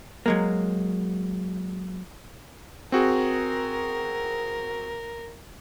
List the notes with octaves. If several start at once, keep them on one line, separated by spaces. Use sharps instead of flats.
F#3 G#3 A#3
C4 F#4 G#4 A#4